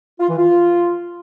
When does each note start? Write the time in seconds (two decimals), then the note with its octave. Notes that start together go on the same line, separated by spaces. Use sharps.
0.20 F4
0.29 E3
0.38 F4